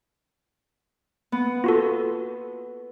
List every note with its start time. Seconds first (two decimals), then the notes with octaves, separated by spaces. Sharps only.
1.32 B3
1.64 F4 F#4 A4